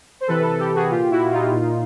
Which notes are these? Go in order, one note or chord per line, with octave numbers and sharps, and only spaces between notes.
C5
C3 E3 A4 B4
A4 B4
G4 A4
F#4 G#4
A#2 F4 G4
E4 F#4
D#4 F4
A#2